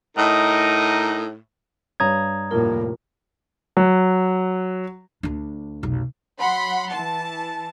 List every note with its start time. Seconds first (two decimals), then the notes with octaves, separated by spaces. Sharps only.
0.17 A2 D#4 A#4 D#5
2.00 G2 C#5 A#5 D#6 G#6
2.51 F1 A2 A3 A#3 F4 A#4
3.77 F#3
5.23 D2 D4
5.83 F1 B1
6.40 F#3 F#5 B5 C6
6.91 E3 A5